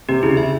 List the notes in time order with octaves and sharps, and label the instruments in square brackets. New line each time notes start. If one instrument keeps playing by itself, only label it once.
[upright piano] C3 [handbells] G4
[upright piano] C#3 [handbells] E4
[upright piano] C#3 [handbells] E5